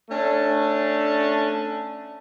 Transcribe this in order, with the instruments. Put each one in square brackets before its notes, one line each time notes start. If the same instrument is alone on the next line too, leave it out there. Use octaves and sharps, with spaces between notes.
[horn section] A3 C#4 D4